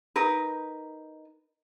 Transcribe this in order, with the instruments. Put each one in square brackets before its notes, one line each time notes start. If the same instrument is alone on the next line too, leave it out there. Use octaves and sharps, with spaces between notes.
[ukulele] D#4 A#4 B4